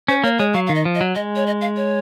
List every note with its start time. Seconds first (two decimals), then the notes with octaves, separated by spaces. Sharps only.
0.08 C#4 C5
0.24 A#3 C#5
0.39 G#3 C#5
0.54 F#3 F5
0.67 D#3 F5
0.75 D#5
0.85 F3
0.95 D#5
1.01 F#3
1.15 G#3 D#5
1.36 C#5
1.46 D#5
1.61 F5
1.77 C#5